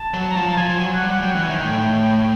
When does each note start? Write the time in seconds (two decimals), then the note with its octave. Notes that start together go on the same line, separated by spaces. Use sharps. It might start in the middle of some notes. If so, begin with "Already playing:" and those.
Already playing: A5
0.14 F#3
0.29 A#5
0.36 F3 A5
0.57 F3 G#5
0.69 F3
0.79 F#3 G#5
0.93 F#5
1.00 G3
1.07 F#5
1.21 F#3 G5
1.32 E3 F#5
1.43 G#5
1.50 D#3 G5
1.64 A2